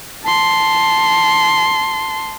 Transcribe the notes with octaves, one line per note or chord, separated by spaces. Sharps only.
A5 C6